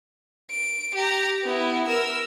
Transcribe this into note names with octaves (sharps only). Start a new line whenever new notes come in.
D7
G4 A#5
B3 E4
A#4 E6